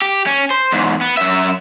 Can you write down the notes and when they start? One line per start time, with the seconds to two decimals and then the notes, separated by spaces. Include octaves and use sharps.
0.02 G4
0.26 C#4
0.50 C5
0.72 E2 G#2
1.01 B3
1.17 F#2 E5